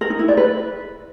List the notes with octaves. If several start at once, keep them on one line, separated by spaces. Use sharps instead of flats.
A#4
D#4
E4
D5
B4